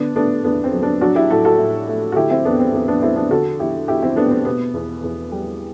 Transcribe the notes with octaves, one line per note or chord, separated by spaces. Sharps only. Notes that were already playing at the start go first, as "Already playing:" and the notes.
Already playing: D3 B3 D4
A3 B3 D4
E2 B3 D4
C4
F#3
B3 D4
F#3 D4 F#4
E4 G4
A2 F#4 A4
F#4 A4
A2
A3
F#4
D3 E4 G4
C4 E4
E2 B3 D4
C4
E2 B3
B3 D4
A3 C4 E4
B3 D4
D3 F#4 A4
E2 E4 G4
E2 E4 G4
C4 E4
A3 B3 D4
C4
B2 B3
E2
E2
G3